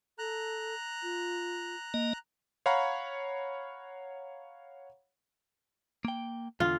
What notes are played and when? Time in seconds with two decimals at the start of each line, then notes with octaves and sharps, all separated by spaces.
0.18 A4 A#5 F#6
1.03 F4
1.94 A#3 D#5
2.66 C#5 F5 F#5 A#5 B5 C#6
6.05 A#3 G5
6.60 E2 D3 F4